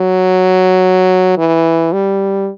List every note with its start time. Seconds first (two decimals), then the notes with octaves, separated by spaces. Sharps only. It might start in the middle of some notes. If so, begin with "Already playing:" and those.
Already playing: F#3
1.38 E3
1.93 G3